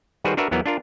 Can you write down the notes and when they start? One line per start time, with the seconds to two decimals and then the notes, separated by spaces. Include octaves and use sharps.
0.24 D#3 G3 F#4 G#4 B4 C5
0.37 D4 F#4 A#4 B4 E5
0.51 E2 E3 F#3 B3 A#4
0.66 D4 F4 A#4